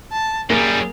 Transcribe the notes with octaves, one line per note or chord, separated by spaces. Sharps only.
A5
F#2 G3 A#3 G#4